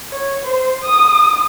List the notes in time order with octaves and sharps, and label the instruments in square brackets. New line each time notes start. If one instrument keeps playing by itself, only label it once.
[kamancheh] C#5
C5
D#6